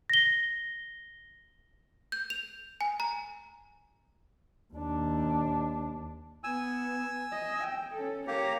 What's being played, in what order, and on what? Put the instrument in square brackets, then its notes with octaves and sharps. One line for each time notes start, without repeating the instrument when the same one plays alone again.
[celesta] A#6 G7
[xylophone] G6
F7
G#5
A#5
[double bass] D#2 D4
[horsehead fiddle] B3 [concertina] G#5 E6
[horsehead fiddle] D#5
G5
C#4 A4
[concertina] A#3 G4 [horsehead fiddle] C#5 A#5